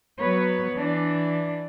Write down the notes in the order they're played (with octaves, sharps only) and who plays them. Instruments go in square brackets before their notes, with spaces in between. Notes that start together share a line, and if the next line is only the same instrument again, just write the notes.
[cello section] F#3 B3 B4 C#5
E3 D4